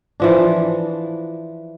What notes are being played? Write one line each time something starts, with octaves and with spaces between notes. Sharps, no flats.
E3 F3 D4